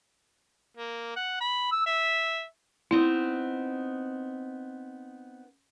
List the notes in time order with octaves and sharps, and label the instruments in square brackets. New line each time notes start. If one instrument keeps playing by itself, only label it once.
[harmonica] A#3
F#5
B5
E6
E5
[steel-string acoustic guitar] B3 C4 D#4 [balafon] E4